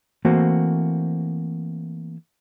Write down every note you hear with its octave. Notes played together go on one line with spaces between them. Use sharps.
E3 A3 A#3 C4 F#4 C5